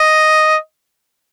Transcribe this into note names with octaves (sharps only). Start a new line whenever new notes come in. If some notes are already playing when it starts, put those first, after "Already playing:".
Already playing: D#5